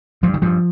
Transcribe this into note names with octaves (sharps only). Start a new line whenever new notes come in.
G2 F3
D#3
G2 F3